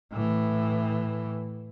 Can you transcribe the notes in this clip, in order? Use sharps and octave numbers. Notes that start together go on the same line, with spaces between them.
A2 E3